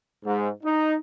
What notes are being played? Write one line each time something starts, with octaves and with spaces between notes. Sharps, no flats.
G#2
D#4